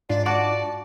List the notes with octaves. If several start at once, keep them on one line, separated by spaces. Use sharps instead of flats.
G#2 D4 F4 D5
F#4 D5 A5